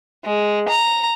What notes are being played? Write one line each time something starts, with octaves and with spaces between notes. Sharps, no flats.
G#3
A#5